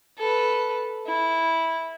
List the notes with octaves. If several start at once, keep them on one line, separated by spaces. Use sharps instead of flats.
A4 B4
E4